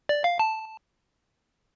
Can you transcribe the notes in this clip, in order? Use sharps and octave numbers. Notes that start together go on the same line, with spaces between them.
D5
F5
A5